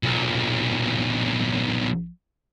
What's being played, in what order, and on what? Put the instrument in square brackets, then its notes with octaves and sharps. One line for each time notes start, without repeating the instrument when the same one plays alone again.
[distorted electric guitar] B1 A#2